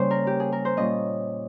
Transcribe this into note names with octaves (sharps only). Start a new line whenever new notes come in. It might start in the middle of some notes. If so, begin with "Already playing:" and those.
Already playing: C#3 G3 A#3 C#4 C5
A#4
G4
G#4
A#4
C5
A#2 G3 C#4 D#5